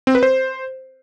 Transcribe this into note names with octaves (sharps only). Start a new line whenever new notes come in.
C4
B4
C5